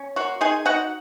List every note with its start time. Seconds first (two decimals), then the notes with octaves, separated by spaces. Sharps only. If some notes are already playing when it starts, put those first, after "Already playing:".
Already playing: C#4
0.16 A#3 F#4
0.41 D#4 G#4 G#5
0.65 D#4 F#4 F#5